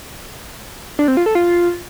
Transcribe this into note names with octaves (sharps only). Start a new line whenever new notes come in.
D4
C4
F4
A4
F4